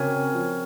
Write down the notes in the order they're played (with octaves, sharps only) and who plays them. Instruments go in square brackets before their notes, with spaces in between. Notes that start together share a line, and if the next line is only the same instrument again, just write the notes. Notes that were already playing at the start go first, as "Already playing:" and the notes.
Already playing: [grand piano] C#3 [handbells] C4 F#4 A#4 C#5 G#5
[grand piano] F3